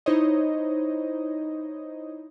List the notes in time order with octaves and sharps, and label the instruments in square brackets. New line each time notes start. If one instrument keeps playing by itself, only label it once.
[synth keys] D#4 E4 C5 C#5 D#5